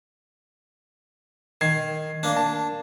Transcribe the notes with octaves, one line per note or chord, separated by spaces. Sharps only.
D#3 G#6 C7
A#3 D4
A5